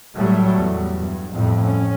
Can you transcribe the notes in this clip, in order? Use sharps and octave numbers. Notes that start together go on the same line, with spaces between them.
A2 F#3 G3 A3
E2
G2
F2 A2 G3
C#4